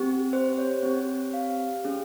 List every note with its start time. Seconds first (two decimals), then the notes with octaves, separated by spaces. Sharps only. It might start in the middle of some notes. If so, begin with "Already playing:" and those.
Already playing: C4 G4
0.33 C5
0.53 C5
0.58 C#5
0.83 C4 G4
1.33 F5
1.84 C#4 G#4